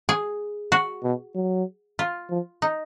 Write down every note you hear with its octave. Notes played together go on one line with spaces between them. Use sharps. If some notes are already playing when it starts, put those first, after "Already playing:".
G#4
F#4
B2
F#3
F4
F3
D#4